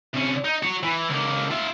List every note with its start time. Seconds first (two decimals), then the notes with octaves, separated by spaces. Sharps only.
0.14 C3 C#4
0.45 D#4
0.63 F#4 C#5
0.83 E3
1.09 C#2 A#3
1.50 F4 E5